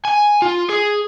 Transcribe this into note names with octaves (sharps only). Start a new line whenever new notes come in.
G#5
F4
G#4